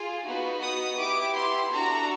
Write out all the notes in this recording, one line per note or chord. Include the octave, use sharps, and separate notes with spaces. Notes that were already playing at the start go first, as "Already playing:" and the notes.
Already playing: F4 G#4
B3 D#4 F#4
D#6
B3 E4 G4 D6
C6
D4 F#4 A4 A#5